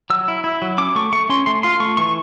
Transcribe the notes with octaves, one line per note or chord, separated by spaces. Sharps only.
F#3 E6
E4
E4
F#3
C#4 D6
A3 C#6
A3 C#6
C#4 C6
A3 C6
F4 C6
A3 C#6
E3 C#6